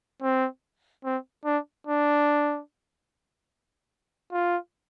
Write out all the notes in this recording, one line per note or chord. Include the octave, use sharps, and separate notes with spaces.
C4
C4
D4
D4
F4